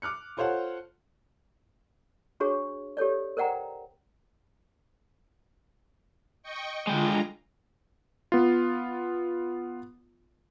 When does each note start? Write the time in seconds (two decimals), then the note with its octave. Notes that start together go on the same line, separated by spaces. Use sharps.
0.02 D6 F6 F#6 C#7
0.37 F4 A4 C5 C#5 F5 F#5
2.40 D4 F#4 G#4 C#5 C#6
2.97 G4 A4 C#5 D5
3.37 A#4 C5 D5 F#5 G5 A#5
6.43 D#5 G5 C#6
6.87 D3 G#3 F4 G5 A#5
8.32 B3 F4